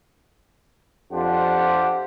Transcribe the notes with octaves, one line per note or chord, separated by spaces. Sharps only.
F2 D4 F4 G4 C5 F#5